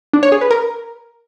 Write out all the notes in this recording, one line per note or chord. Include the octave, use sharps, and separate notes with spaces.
D4
C#5
G#4
B4
A#4